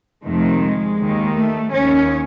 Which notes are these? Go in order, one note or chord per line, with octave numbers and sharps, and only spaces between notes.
F2 C3 D#3 A3
G#3
D#2 D#3
A3
D#2 D#3 C#4